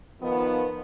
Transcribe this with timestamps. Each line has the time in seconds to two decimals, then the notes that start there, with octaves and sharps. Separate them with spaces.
0.21 D#3 F3 B3